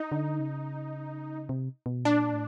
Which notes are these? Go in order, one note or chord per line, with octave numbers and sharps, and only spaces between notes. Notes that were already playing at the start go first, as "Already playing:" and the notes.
Already playing: D#4
D3
C#3
C3
B2
A#2 D4
A2